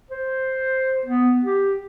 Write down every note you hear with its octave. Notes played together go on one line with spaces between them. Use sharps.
C5
B3
G4